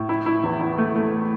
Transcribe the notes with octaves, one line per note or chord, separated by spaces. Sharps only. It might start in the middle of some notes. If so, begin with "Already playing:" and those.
Already playing: A2
E4
E4
E2
E4
A3
A3